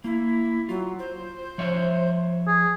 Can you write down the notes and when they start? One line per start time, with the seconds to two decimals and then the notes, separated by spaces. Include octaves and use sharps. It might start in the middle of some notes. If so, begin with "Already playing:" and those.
0.04 A#3 E4
0.69 F#3 F4
0.99 C5
1.58 F3 C#5 E5
2.47 G#4